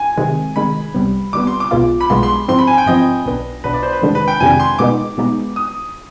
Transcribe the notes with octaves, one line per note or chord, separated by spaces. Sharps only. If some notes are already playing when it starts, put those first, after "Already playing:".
Already playing: G#5
C3 D#3 G#3
C3 D#3 G#3 B5
C2 C3 G3 B3
C2 C3 G3 B3 D6
C6
D6
B1 B2 G#3 B3 F4
B5
B1 B2 G#3 B3 F4 C6
C6
G#2 F3 C4 C6
B5
G#5
G5
G#2 F3 C4 D#5
B1 B2 B3 D4
B1 B2 B3 D4 B4
D5
C5
B4
F2 C3 D#3 G#3 D4
B4
G5
F2 C3 D#3 G#3 D4 G#5
C6
B2 G#3 B3 D#4 D6
B2 G#3 B3 D#4
D#6